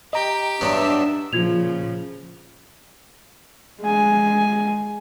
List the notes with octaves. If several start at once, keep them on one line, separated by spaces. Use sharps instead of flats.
G4 D#5 G5 A#5
G2 F#3 B3 D4 E5
A#2 C#3 F3 F4 G#6 F7
G#3 G#5